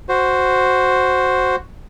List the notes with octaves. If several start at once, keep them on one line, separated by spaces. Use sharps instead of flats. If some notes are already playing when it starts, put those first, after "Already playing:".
F#4 C5